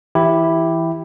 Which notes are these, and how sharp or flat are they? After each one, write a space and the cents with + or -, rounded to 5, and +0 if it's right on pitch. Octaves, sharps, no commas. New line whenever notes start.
E3 +0 E4 +0 G4 +0